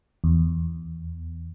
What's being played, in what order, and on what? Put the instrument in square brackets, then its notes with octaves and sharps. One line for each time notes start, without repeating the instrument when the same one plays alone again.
[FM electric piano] E2